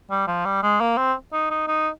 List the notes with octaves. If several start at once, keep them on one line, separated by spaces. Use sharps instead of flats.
G3
F3
G3
G#3
A#3
C4
D#4
D#4
D#4